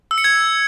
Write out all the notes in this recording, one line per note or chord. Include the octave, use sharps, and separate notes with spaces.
E6
C#7
G#6